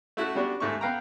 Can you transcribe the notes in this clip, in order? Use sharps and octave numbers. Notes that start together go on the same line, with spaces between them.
A3 E4 F#4 A4 F#6
G3 B3 D4 F#4
D#2 G#2 A3 A#3 C#6
B3 B4 F5 G5 A#5